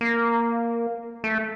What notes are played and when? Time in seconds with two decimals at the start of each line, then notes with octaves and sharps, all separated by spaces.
0.01 A#3
1.24 A3